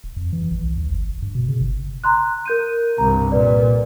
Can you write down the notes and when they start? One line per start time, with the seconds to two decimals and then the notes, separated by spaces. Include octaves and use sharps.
0.04 D#1
0.16 F2
0.33 E3
0.51 A1
0.63 C2
0.77 D#2
0.89 G1
1.07 E1
1.22 G2
1.35 B2
1.49 C#3
1.61 G1
2.04 A#5 C6 F#6
2.46 A#4 G6 D#7
2.98 C2 G2 A#5
3.32 A#2 B4 D5